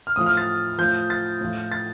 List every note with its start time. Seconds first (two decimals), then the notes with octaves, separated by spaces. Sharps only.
0.07 F6
0.16 A2 F3 D#6
0.26 F6
0.37 A6
0.79 A2 F3 G6
1.10 A6
1.41 A2 F3
1.72 A6